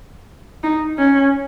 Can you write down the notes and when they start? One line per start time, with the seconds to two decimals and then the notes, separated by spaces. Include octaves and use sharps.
0.63 D#4
0.98 C#4